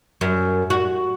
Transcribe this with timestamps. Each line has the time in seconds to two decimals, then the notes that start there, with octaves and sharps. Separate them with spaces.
0.21 F#2
0.70 F#4